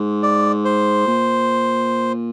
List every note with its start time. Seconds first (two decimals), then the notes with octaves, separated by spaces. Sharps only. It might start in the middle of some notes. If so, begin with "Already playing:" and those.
Already playing: G#2
0.23 D5
0.65 C5
1.07 A#2